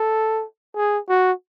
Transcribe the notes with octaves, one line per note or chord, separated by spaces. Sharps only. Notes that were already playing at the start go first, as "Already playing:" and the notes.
Already playing: A4
G#4
F#4